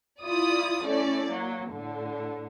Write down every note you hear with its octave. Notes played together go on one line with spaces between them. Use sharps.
E4 F4 D5 D#6
A3 C#4 E4 D5
F#3 A#3
A2 D3